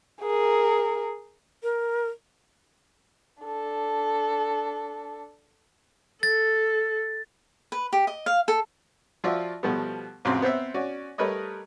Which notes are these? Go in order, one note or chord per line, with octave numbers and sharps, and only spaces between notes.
G#4 A#4
A#4
D4 A4
A4 A6
B4
G4
D#5
F5
A4
F3 F4 F#4 D5 E5
B2 F3 G3 A3 B3
A1 F2 C#3 C4 F#4 C6
B3 C4 C5 E5
C#4 F#4 D5
G3 A3 A#4 B4 C#5 D#5